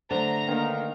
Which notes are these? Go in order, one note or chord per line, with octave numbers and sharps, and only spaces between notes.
D3 A3 C5 A#5
D#3 A#3 D4 B4 F5